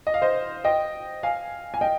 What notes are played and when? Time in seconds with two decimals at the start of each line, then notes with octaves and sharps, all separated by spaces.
0.07 D#5
0.14 F5
0.22 C5 D#5
0.64 D#5 G5
1.23 F5 G#5
1.74 G#5
1.81 D#5 G5